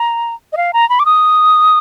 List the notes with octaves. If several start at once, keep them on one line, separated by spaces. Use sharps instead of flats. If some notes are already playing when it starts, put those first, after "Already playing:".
Already playing: A#5
D#5
F5
A#5
B5
D6
D#6